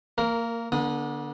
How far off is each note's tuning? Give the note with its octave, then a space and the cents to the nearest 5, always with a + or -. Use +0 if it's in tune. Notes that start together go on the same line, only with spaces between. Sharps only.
A#3 -20 A#4 +0
D3 +0 B3 -45 D#6 +0